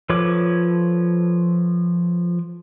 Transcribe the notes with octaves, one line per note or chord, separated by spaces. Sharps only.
F3 A4 B4 C#5 D6